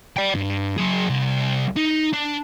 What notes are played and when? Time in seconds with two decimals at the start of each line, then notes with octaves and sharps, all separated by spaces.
0.17 D5 G5
0.35 G2
0.78 F#3 G#4
1.10 C2
1.77 D#4
2.13 D4